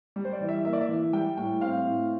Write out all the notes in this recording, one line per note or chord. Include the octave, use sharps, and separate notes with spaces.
G3
C5
D5
E3
E5
A#3 E5
D5
E5
E3
G3 G5
A2 G5
C4 F5
A2